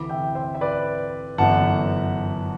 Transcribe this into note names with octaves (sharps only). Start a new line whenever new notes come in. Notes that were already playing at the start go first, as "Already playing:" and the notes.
Already playing: D2 C3 E3 B5 D6
E5 G5
C5 E5
E5
B4 D5
G1 F#2 E3 F#5 A5